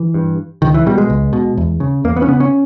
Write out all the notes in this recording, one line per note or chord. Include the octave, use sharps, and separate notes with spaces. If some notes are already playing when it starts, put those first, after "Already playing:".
Already playing: E3
G2
C#2 D#3
E3
B2 G3
G#3
C#2
B2
E2
C#3
E2 A#3
B3
C#4
C#3 B3
C#4